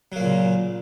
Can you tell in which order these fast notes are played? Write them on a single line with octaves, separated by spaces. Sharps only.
F#3 A#3 A#2 C#3